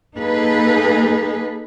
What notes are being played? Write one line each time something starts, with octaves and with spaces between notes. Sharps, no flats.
A#3 D#4 G#4 A4 B4